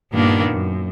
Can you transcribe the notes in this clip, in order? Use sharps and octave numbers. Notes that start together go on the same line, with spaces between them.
G2 A#2 D#3 A#3 B3 D4
F#2